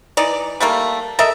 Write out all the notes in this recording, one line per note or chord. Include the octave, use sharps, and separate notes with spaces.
E3 D#4 D5
G3 A3 A#3
A4 A#4 D#5 E5